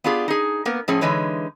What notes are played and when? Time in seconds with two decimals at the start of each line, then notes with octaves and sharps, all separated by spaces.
0.04 B3 D4 F4 G4 G#4
0.28 D#4 G#4
0.65 A#3 B3 A#4
0.88 A2 F3 C#4 G#4
1.01 D3 E3 G#3 D#4 B4 C#5